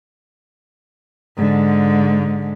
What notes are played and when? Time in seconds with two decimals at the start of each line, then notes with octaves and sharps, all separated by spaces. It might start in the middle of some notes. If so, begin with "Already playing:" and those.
1.37 G#2 D3